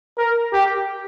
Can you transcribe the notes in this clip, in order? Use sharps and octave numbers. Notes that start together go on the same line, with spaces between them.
A#4
G4